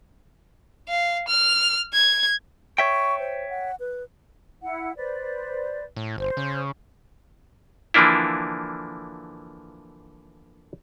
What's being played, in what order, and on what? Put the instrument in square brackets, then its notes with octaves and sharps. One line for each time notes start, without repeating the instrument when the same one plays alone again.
[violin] F5
F6
G#6
[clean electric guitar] C#5 E5 G5 [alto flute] C#6
[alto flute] C5
F#5
B4
[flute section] E4 F#5
B4 C5 D5
[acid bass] A2
[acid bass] G1 [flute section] C5
[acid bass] C#3
[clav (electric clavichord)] D3 E3 F3 A#3 D4 E4